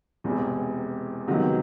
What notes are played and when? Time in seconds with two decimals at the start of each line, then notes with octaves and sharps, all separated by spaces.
0.24 E1 E2 C3
1.28 C#2 C3 D#3 F#3 B3